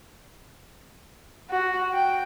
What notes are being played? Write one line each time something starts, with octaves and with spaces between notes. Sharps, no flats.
F#4
G5